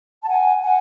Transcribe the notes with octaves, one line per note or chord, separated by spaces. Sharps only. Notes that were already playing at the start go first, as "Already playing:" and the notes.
A5
F#5 G#5
F#5 G#5